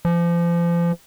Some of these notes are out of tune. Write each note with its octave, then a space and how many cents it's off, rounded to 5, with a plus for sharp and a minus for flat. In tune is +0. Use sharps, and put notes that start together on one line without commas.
F3 -35